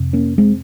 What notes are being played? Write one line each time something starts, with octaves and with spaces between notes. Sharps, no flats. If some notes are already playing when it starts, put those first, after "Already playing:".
Already playing: F2 C3
A#3 C#4
G#3 C4